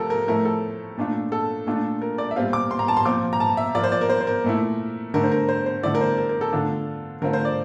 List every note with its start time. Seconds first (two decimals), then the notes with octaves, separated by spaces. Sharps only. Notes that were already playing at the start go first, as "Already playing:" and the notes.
Already playing: C3 F3 A3 F4 A4 A#4
0.10 A#4
0.28 A2 F3 A3 E4 A#4
0.45 A4
0.97 A#2 A3 D4 F4
1.32 A4
1.67 A#2 A3 D4 F4
2.02 A#4
2.18 D5
2.31 E5
2.36 A#2 G3 C4 F4 F5
2.53 D6
2.71 C6
2.79 A#5
2.88 A5
2.97 C6
3.05 A#2 F3 C4 F4 D6
3.33 A#5
3.40 A5
3.57 E5
3.75 F3 A#3 F4 D5
3.84 C5
3.92 D5
4.01 A#4
4.09 C5
4.21 C5
4.27 A#4
4.44 A#2 A3 E4
5.14 D3 A3 D4 A#4
5.23 C5
5.32 A#4
5.49 C5
5.66 C5
5.83 D3 A3 E4 D5
5.95 A#4
6.01 C5
6.18 A#4
6.29 A#4
6.41 A4
6.53 D3 A3 D4 F4 A4
7.22 D3 A3 C4 F4 A#4
7.33 C5
7.45 D5